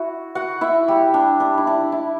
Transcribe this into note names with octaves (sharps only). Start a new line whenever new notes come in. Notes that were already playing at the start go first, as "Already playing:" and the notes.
Already playing: E4 F#4
F#4 F#5
E4 E5
G3 G4
D4
D4
E4
D4
E4